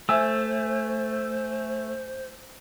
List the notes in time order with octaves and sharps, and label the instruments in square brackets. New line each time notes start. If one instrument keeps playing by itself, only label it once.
[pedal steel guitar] A3 [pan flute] C5 [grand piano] E5 G#5 E6